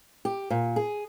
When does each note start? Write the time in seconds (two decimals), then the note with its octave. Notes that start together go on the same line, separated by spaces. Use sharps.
0.25 G4
0.50 A#2
0.76 G#4